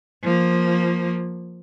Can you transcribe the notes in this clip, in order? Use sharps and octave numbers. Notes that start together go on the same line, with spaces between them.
F3 A#3